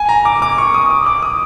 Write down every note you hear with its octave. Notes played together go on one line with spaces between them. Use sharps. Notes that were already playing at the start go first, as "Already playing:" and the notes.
Already playing: G#5
A#5
D6
D6
C#6
D#6
D6
D6
D#6